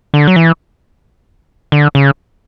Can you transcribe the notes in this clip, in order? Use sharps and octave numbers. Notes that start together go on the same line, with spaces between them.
D3
F#3
E3
D3
C#3